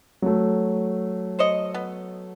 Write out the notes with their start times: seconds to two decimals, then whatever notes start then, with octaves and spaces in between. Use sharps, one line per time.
0.22 F#3 A3
1.39 C5 C#5 D#5
1.74 B3